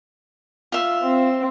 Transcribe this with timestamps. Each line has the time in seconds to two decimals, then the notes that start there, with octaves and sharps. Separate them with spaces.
0.72 F4 E5
1.03 C4